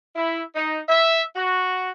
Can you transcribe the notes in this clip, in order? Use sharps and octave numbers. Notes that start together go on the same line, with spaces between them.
E4
D#4
E5
F#4